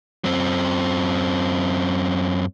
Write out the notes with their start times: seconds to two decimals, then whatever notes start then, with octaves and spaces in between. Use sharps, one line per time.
0.24 F#2 C4